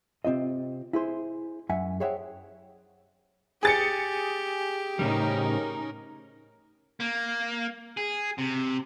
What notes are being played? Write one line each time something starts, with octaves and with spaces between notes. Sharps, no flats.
C3 C4 F4 D#5
E4 G#4 C5
F#2 E5 F#5 G#5
G#4 C5 C#5 E5 F#5 G5
G4 G#4 A6 C#7
A2 C#3 G3 C#4 D#4 A#4
A#3
G#4
C3